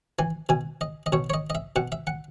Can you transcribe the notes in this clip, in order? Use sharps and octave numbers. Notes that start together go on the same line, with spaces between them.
E3 G#5
B2 G#5
D#5
D#5
B2 C#5
C#5
D#5
D#5
E5
B2 F#5
E5
F#5